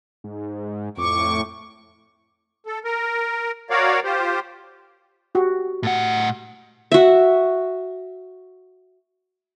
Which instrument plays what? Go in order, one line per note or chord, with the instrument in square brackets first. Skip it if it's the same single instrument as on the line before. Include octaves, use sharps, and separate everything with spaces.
[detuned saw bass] G#2
[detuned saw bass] F2 [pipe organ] A2 C#6 [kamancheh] D6
[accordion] A4
A#4
F#4 A#4 C#5 D5 F5
F4 G4 C5
[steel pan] F#4 G4
[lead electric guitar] A2 F#5
[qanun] F#4 E5